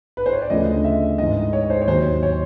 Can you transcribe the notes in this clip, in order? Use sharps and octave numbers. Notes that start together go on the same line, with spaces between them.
B4
C5
C#5
D5
D2 C#3 F3 A3 D#5
E5
G#2 E3 G#3 D#5
C#5
C5
C#5
D#2 D#3 F#3 C5
C#5